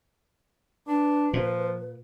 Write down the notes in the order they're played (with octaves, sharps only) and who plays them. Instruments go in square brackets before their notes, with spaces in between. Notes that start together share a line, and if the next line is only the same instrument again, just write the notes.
[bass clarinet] D4 [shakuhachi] B4
[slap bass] A#2 [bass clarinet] F3